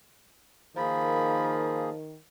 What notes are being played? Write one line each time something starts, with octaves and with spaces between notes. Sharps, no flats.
D#3 F3 A#3 G#4 B5